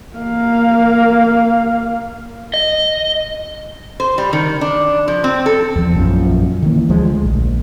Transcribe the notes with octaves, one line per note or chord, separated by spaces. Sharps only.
A#3 F5
D#5
C5
G3
D#3
D4
F3
C4
A4
E2 F3
A#1 F#2 F3 C#4
D#3 E3 A#3
D2 F3 G#3
D2
A#1